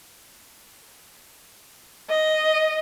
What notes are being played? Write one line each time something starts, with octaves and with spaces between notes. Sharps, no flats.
D#5